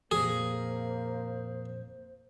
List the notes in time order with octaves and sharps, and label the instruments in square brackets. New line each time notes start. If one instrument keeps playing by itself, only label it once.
[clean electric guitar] F2 A#2 [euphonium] A#3 [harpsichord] G#4 [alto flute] C5